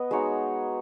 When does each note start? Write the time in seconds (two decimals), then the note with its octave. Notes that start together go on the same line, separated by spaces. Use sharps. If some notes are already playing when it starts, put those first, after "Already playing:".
Already playing: B3 D#5
0.11 G#3 D#4 F#4 C#5